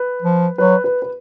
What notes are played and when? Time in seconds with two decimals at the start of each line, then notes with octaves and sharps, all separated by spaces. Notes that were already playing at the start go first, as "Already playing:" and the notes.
Already playing: B4
0.22 F3
0.58 F#3 B4
0.84 B4
1.02 B4